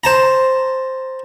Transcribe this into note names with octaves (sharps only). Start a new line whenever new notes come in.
C5 A5 A#5